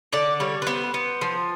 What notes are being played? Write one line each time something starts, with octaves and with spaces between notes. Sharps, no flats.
D3 D5
G3 C#5
B4
B3 C5
B3
F3